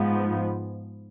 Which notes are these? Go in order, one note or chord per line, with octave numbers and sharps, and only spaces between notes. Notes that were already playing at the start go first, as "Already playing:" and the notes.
Already playing: G#2 F3 B3